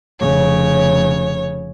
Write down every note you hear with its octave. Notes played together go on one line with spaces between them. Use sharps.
F1 C#3 C#5